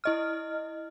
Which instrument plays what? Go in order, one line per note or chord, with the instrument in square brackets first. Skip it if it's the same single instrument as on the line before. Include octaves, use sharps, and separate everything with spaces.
[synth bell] E4 D#5 F6